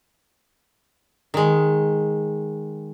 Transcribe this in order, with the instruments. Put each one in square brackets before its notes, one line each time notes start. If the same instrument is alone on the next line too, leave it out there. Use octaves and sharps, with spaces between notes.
[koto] D#3 G#3